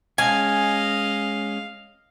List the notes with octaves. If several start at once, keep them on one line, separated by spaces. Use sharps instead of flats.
G#3 C#4 D#5 F5 G#5